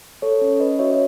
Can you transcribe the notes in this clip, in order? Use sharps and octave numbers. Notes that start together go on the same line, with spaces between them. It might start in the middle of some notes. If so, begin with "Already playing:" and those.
A4 C#5
C#4
C#4 B4 D#5
F#4 C#5 E5
C#5